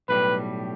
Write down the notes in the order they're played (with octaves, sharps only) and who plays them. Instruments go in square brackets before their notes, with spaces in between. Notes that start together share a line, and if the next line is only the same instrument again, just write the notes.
[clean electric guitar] B1 A2 G3 [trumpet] B4